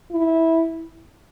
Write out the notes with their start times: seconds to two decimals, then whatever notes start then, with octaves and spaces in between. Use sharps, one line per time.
0.11 E4